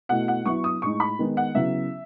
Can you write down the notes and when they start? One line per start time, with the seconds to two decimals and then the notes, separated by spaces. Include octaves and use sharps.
0.09 B2 A3 E4 F#5
0.28 F#5
0.45 F#3 B3 E4 C#6
0.64 D#6
0.82 A2 G#3 D#4 C#6
1.00 B5
1.19 D#3 G#3 B3 D#4
1.37 F#5
1.55 C#3 F#3 B3 E4 E5